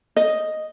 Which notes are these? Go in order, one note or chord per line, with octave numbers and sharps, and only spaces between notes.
D#5